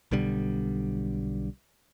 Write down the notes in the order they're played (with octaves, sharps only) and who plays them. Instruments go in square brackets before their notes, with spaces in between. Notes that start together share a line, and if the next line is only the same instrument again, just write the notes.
[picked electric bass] B1 B2 D3 G3